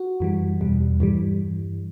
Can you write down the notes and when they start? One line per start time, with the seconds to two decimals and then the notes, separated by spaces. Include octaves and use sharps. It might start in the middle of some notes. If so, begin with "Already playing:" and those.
Already playing: F#4
0.20 F#2 E3 G3
0.61 E2 B2 G3
1.00 G2 E3 G3